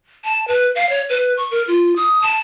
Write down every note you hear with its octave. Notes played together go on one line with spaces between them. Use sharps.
A5
B4
F5
C#5
B4
C#6
A#4
F4
D#6
A5